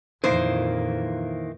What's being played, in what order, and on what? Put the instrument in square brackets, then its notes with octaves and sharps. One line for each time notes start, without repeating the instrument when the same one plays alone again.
[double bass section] F2 A#2 [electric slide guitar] D#3 E3 A#3 [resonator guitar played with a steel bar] C5